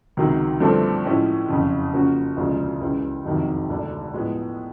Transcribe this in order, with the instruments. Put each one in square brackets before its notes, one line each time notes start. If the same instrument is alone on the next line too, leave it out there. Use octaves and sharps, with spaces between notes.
[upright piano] C#2 C3 D#3 F#3
G2 D3 F3 A3 C4
A2 F3 G#3 C#4 E4
F#1 F2 C#3
C#3 F3 A#3 C#4 F#4
E1 D2 C#3 F3 G#3
C#2 C#3 E3
F#1 F2 C3 D#3 F#3
E1 D2 D3
A2 F3 G#3 B3